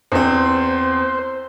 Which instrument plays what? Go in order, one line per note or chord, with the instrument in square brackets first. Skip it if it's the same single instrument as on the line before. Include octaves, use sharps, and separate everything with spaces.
[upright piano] E2 C4 [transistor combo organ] C5